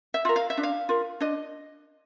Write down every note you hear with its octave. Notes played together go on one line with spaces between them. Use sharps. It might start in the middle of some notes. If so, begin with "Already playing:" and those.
E5
F4 A#4
F5
E5
D4
F5
F4 A#4
D4 D#5